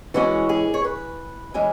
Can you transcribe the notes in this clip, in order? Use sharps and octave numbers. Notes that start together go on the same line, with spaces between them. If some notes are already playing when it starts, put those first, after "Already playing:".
E3 G#3 C#4 F#4
G#4
C#5
B4
E3 G#3 C#4